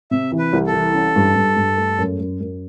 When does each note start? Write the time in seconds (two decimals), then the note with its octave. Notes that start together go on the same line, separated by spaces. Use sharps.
0.11 C3 E5
0.32 E3
0.39 B4
0.53 C2
0.67 A4
0.73 E3
0.94 C#4
1.16 G2
1.36 G2
1.56 G2
1.77 A3
1.98 F#2
2.19 F#2
2.40 F#2